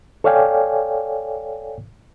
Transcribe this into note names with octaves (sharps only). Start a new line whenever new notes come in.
A4 C#5 D5 F5 G5 G#5